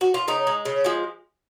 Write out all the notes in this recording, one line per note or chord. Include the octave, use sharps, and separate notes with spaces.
F#4
F4
C#3 D#4
G#3
C#3
F3 G#3